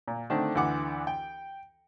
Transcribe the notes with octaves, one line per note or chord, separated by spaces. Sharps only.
A#2
D3 D#3 A3 C4 D4
D2 E3 F#5 D6
G5